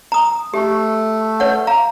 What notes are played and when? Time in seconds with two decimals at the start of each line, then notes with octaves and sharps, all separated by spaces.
0.12 A#5 D#6
0.54 A3 G4
1.40 B4 C#5 F#5
1.67 F5 A#5